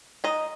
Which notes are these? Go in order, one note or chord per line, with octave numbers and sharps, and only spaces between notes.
G#3 D#4 D#5